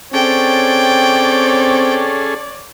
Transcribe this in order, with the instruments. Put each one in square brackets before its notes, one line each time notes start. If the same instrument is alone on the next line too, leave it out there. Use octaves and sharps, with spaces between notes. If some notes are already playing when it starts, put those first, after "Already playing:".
[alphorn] C4 [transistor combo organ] C#4 G#4 A4 [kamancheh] C#5 D5 [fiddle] G5